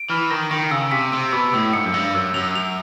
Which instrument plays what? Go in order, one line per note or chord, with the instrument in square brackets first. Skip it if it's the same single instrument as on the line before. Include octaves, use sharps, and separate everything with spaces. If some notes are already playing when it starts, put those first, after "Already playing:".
Already playing: [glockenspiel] D7
[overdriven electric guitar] E3 [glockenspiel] F6
[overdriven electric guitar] D#3 [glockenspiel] A#6
[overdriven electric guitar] D#3 [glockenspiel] A#6
[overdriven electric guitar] C#3 [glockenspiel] E6
[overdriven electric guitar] C3 [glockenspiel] B6
[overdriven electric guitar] C3 [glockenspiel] E6
[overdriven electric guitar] B2 [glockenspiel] E6
[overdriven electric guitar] A2 [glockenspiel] E6
[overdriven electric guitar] G#2 [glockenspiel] C#7
[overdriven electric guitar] F#2
[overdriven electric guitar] G2 [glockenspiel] E6
[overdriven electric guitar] F#2 [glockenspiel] E6
[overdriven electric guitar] F#2 [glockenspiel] F7
[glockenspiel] F7